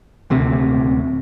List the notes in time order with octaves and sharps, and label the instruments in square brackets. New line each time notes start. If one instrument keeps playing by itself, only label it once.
[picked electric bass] D#1 D2 C3